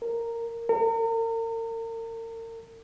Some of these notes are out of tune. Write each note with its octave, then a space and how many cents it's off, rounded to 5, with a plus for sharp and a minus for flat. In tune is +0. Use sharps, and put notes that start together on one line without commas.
A#4 -10
A#4 -40